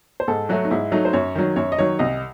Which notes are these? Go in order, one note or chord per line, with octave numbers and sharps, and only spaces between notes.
C5
G#2 A4
F#3 A3 F#4
D#4
G#2 E4
F#3 A3 D#4
C5
F#2 C#5
D#3 F#3
F#2 C#5
D#5
D#3 F#3 C#5
C2 D#5